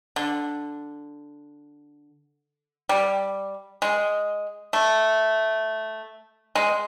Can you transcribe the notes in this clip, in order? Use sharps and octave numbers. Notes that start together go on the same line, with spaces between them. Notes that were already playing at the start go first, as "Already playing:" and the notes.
D3
G3
G#3
A3
G#3